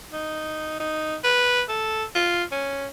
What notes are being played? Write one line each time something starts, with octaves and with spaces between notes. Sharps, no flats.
D#4
D#4
B4
A4
F4
C#4